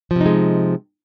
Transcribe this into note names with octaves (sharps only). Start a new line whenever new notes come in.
C3 F3 G#3 D#4